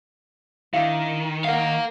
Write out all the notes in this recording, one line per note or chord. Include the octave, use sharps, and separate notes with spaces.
D#3 D4 E4 F5
D#4 A#4 F5 F#5